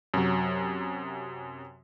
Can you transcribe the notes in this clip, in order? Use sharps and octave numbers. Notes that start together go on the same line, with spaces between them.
F#2 C3 F#3